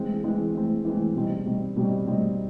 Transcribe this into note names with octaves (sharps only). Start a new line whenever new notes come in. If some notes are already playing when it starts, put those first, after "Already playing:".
Already playing: E3 G#3 C4
E3 G#3 C4
E3 G#3 C4
E3 G#3 C4
B2 G3 C4 D#4
B2 G3 C4 D#4
B2 G3 C4 D#4
B2 G3 C4 D#4